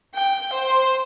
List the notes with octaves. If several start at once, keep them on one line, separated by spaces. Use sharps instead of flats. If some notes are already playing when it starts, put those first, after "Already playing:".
G5
C5